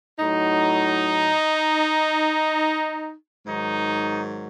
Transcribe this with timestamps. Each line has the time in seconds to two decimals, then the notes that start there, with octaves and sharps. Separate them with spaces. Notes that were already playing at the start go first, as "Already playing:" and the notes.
0.18 A2 F#3 D#4
3.47 G#2 D#3 F#3 D#4